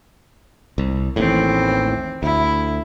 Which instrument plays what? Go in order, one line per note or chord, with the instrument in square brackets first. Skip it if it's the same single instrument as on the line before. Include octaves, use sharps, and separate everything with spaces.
[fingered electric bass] C2
[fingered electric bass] A1 D#2 A2 [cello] E3 C4
[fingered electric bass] D2 [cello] E4